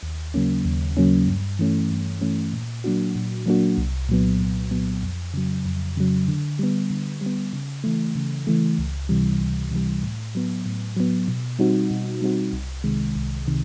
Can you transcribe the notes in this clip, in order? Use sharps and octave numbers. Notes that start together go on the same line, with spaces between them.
D#2
C#3 F#3 A#3 C#4
D#2
C#3 F#3 A#3 C#4
G2
E3 A3 C#4
G2
E3 A3 C#4
A#2
F#3 A#3 D4 F#4
A#2
F#3 A#3 D4 F#4
C2
A#2 F#3 B3
C2
A#2 F#3 B3
F2
C#3 F#3
F2
C#3 F#3
D3
G3 B3
D3
G3
B3
C#3
E3 A3
C#3
E3 A3
C#2
C3 E3 G3
C#2
C3 E3 G3
A2
F#3 B3
A2
F#3 B3
B2
G3 C4 D#4 F#4
B2
G3 C4 D#4 F#4
C2
C3 D#3 G#3
C2
C3 D#3